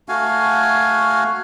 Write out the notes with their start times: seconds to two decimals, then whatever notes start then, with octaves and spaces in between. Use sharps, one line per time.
0.09 A3 F#4 F5 G#5